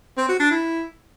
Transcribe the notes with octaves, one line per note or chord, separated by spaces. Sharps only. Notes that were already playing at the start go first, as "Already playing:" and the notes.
C4
F#4
D4
E4